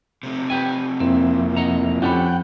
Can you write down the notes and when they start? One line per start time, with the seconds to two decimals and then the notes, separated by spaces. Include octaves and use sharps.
0.23 C3 A3
0.50 G4 B4 G5 G#5
1.00 F2 A#3 C4 E4
1.57 D#5 F#5 A#5
2.02 F2 C#4 G4 A4 F#5 G5 B5